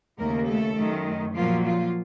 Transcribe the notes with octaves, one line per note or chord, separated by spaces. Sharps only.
D#2 C#3 A3 A#3 A#4
A3 A4
F#2 D#3 A3
A#2 F3 F#3 A#3 F4
F3 F4